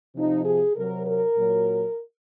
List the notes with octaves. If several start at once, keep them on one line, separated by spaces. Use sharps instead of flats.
C3 F3 D#4
G#4
C3 F#3 A#4
A#4
A#2 F#3